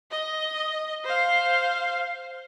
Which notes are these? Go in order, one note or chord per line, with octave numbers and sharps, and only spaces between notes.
D#5
C5 F5